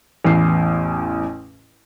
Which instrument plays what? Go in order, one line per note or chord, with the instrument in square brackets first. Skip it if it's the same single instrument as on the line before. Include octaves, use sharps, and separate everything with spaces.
[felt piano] A1 E2 C7